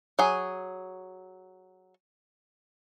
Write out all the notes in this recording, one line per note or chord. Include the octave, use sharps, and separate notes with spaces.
F#3 G#4